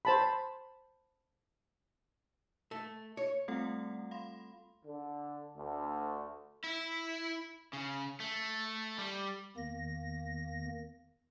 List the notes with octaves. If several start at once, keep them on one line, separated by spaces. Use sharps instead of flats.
C5 A5 B5
A3
C#5
G3 A3 C4 F4 A4 F#5
F5 B5 C6
D3
D2
E4
C#3
A3
G3
E2 D#3 A#3 A#6